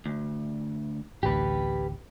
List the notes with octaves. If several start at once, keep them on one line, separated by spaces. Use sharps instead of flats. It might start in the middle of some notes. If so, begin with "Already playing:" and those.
D2
A1 D2 G4 B4